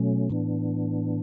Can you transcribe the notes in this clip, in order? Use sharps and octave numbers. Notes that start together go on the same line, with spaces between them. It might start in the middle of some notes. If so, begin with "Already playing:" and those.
Already playing: B2 F#3 A3 C#4
A2 E3 B3 D4